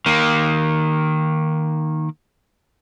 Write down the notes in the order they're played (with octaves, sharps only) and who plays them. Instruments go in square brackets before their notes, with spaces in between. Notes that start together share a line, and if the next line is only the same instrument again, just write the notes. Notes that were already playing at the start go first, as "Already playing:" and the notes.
[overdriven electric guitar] D#3 A#3